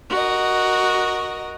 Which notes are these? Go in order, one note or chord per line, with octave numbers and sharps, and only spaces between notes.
F#4 A#4 D#5